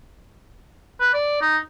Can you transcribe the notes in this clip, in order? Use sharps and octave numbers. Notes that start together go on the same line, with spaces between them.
B4
D5
D#4